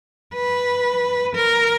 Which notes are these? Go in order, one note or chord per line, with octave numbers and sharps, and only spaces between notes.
B4
A#4